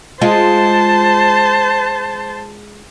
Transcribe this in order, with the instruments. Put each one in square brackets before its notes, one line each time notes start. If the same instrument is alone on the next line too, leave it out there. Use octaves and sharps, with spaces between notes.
[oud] G#3 F4 [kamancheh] C5 A5